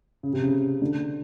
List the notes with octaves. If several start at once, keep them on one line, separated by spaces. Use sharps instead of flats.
C#3
C3
C#3
D3